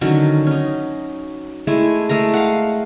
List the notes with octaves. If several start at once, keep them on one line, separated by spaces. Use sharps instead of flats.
D3 D#3 F#3 C#4
C#4 D#4
G#3 A3 E4 G#5
G#3 A3 A#4 A#5
F5 F#5